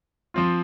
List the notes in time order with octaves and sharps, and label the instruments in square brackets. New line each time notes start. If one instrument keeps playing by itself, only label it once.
[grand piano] F3 C4 F4